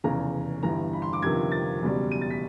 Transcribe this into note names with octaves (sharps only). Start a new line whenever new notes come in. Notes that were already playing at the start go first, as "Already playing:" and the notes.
F1 E2 C#3 E3 A#5
G1 G2 E3 A#5
B5
C6
D6
G1 F2 C3 D#3 G#6
A6
F#1 E2 B2 G3
D#7
A6
B6